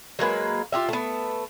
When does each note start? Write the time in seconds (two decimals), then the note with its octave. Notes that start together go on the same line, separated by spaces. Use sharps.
0.19 F#3 G#3 A#3 B4
0.72 F4 G4 E5
0.89 A3 B3